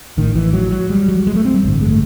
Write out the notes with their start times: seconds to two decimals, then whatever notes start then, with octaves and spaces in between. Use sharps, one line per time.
0.17 A1 A2 D#3
0.35 E3
0.53 F#3
0.72 F#3
0.90 G3
1.08 F#3
1.20 G3
1.27 G#3
1.35 A3
1.45 C4
1.54 G3
1.63 A1 G2 D3
1.81 G#3
1.90 A3